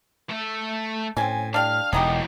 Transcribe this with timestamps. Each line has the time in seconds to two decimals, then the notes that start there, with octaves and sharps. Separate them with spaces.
0.29 A3 E5
1.17 A2 C4 C#4 G#5
1.54 G3 D4 F5 F6
1.93 E1 D3 E3 F#3 D#4 G4 D#6